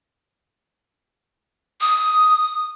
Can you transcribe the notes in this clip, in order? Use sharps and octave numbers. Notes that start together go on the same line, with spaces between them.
D#6